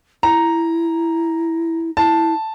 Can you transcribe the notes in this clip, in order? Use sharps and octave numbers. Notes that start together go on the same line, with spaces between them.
E4 A#5
E4 A5